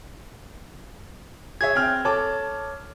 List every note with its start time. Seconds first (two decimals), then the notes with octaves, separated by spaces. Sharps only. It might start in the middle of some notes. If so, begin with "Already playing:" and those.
1.61 G#4 C#5 E5 G#6
1.75 C4 G5 F6
2.05 A4 C#5 A5 D6